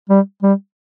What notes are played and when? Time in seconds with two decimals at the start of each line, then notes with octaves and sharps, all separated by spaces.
0.10 G3
0.43 G3